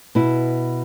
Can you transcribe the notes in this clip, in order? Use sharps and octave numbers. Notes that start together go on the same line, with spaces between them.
B2 B3 E4